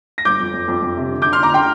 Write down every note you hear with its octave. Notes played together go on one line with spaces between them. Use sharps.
A#6
G1 D6 G6
F2
F2
F2
F2
C3
D3
D3 D6 G6
C6 F6
D3 A#5 D6
D3 G5 C6